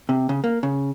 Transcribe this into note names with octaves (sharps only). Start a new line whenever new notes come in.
C3
C#3
A#3
C#3